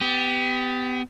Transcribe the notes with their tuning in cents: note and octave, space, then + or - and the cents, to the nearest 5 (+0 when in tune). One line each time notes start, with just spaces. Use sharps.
B3 +30 G4 +0